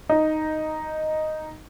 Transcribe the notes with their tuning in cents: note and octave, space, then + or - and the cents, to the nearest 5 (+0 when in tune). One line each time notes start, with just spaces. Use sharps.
D#4 +0